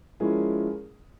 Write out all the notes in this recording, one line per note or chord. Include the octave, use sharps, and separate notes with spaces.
F3 G#3 C#4 E4 G#4 A#4